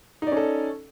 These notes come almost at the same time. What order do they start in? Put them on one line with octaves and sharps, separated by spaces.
D#4 D5 C#4 A4